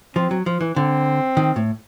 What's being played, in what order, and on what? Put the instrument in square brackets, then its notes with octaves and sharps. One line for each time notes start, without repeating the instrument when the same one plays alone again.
[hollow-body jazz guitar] F3 [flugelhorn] C4
[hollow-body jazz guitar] F#3
F3
E3
[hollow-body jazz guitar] D3 [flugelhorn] C4
[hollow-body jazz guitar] D#3
A2